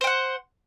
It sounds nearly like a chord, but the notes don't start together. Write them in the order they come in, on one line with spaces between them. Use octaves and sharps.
C5 G5 F#5